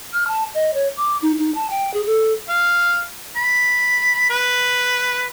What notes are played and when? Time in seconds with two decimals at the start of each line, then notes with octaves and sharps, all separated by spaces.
0.13 F6
0.28 A5
0.54 D#5
0.74 C#5
0.97 D6
1.22 D#4
1.39 D#4
1.55 A5
1.70 G5
1.94 G#4
2.06 A4
2.49 F5
3.36 B5
4.30 B4